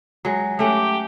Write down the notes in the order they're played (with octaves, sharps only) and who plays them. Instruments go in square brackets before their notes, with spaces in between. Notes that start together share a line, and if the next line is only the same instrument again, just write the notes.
[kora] F#3 G#3
[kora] A3 C#4 F#5 [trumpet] G4